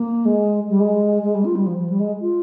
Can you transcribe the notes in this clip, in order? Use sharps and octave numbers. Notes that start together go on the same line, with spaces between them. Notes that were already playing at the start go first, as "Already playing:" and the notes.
Already playing: A#3
G#3
G3
G#3
G#3
G3
F4
G3
F3
F3
G3
G#3
F4